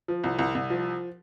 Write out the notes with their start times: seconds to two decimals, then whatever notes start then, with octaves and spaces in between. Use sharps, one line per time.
0.08 F3
0.24 C2
0.39 C2
0.55 C2
0.70 F3